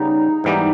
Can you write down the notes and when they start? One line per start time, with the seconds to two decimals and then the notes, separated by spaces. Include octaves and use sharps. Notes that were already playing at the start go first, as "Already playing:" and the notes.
Already playing: C#3 G3 B3 D#4
0.44 G#2 E3 G3 B3 G4